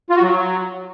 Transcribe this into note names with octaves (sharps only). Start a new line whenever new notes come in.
F4
F#4
F#3